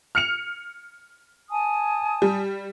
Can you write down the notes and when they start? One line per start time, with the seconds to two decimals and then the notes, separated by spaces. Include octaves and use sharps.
0.15 F6 C#7 F7
1.50 G#5 A5 D#6
2.22 G3